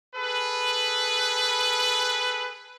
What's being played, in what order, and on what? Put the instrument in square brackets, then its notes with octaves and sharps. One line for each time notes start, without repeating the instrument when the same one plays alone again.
[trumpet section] G#4 A4 B4